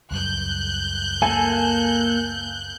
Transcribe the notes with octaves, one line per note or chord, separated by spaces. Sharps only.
C#2 F#2 G3 F#6 G6
A#3 A4 G#5